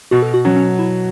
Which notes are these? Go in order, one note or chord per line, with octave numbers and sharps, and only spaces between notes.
B2 F#4
A4
F#4
F#3 C#4
C#4
E4